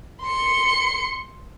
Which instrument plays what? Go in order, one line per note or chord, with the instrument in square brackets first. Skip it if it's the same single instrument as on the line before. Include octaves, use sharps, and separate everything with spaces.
[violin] C6 C#7